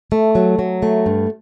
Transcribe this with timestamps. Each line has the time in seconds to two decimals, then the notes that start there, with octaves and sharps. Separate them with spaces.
0.12 A3
0.35 F#3
0.59 F#3
0.83 A3
1.06 G2